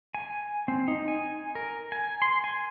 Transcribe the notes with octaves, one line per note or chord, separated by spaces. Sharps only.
G#5
C4
D#4
G#5
A#4
G#5
C6
G#5